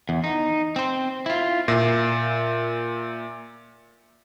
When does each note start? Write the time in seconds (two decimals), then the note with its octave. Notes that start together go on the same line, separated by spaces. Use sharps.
0.09 E2
0.24 D#4
0.76 C4 C5
1.26 E4 F4
1.68 A#2 E5 A#6 C7